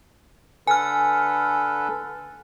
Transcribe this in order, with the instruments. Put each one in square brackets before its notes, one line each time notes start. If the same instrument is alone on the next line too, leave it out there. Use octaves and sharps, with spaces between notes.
[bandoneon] D3 A4 B4 [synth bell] G#5 F6